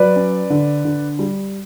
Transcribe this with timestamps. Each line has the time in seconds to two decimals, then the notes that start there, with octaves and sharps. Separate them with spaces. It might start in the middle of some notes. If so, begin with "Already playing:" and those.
Already playing: F#3 B4 D5
0.16 C#4
0.50 D3
0.85 D3
1.19 G3